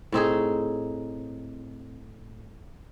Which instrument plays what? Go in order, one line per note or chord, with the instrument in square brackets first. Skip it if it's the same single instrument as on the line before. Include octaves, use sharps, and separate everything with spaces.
[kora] A2 C4 D#4 G#4